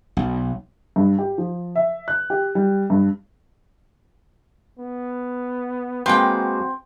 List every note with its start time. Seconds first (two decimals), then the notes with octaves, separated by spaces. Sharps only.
0.17 B1
0.96 G2
1.18 G4
1.38 F3
1.76 E5
2.08 F#6
2.30 G4
2.55 G3
2.90 G2
4.79 B3
6.06 G#3 A#3 C4 F#4 B4 G5